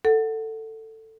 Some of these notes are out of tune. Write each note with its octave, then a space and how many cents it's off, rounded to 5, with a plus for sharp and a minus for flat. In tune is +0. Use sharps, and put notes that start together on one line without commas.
A4 +15 F#5 +0